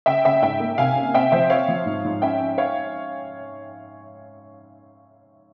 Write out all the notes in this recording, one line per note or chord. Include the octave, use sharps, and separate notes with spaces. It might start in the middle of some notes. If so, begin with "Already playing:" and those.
C#3 E5 G5
C#3 E5 G5
G#2 E5 G5
A#3
C3 F5 G#5
C#4
C4 E5 G5
F3 C5 E5
C4 C#5 F5
F3
G#2
G#2
C#4 E5 G5
C#4
C#5 F5